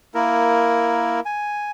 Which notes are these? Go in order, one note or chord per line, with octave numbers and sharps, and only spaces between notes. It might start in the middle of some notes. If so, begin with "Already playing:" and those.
A#3 E4 A#4
G#5